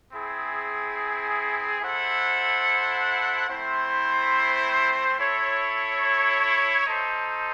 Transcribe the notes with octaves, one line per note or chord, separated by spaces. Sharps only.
C4 E4 G#4
E4 A4 C5 F#5
A3 C4 E4 C5
E4 A4 C#5
D#4 A4 C5